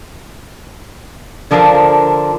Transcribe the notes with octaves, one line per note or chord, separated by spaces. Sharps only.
D3 F3 D4 A#4 C5 F5